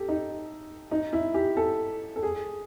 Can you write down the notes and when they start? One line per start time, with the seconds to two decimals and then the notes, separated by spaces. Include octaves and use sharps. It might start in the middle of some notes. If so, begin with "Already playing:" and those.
Already playing: G4 A4
0.09 D#4
0.91 D#4
1.13 E4
1.34 G4
1.57 A4
2.16 A4
2.23 G#4